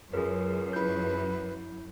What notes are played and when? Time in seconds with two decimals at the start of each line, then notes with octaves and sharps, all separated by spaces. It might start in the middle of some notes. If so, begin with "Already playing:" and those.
0.14 C#2 F#2 G#4 A#4
0.73 E4 B4 G6